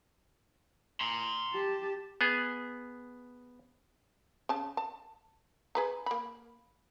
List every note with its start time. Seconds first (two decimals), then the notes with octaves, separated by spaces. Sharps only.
1.01 A#5 C6
1.53 G4 A5
2.21 B3 G#4
4.49 C#3 A5
4.77 A5
5.75 G#4 B4 A#5
6.06 A#3 B5